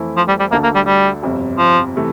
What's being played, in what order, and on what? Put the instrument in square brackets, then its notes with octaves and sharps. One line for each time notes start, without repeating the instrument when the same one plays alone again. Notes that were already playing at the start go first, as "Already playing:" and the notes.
Already playing: [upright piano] F2 E3 A3 C4 E4
[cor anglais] F3
G3
G3
[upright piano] D2 D3 A3 D4 A4 [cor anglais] A#3
[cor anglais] A#3
G3
G3
[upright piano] G1 F2 C3
[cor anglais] F3
[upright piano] C3 E3 A3